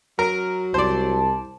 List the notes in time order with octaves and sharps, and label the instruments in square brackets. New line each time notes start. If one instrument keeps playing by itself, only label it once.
[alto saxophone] F#3 [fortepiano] A#4
[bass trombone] C2 [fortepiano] C5 D5 [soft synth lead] A5